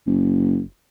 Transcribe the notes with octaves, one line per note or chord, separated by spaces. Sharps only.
F#1